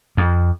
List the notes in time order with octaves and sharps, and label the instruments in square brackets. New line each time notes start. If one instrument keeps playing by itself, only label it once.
[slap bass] F2